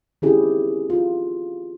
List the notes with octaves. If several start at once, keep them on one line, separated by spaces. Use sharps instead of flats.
D#3 C4 C#4 E4 G4 G#4
F4